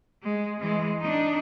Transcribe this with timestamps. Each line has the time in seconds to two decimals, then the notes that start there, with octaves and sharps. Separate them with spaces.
0.23 G#3
0.60 E3 G#3
1.01 D4 D#4